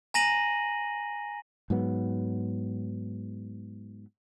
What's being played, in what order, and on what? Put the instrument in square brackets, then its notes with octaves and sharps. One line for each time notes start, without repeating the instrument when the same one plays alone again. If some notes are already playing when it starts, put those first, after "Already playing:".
[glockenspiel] G#5 A#5 A#6 D#7 F#7
[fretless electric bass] G#2 F#3 B3